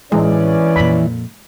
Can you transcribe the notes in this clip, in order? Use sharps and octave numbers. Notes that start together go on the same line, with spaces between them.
A1 E3 G#3 C#4 B4 D5
F2 A#2 B5